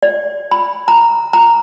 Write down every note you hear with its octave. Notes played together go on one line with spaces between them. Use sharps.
D5
B5
A#5
A#5